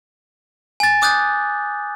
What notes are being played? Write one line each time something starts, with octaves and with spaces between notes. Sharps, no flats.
G#5 A6
G#5 D6 D#6 F#6 G6 A6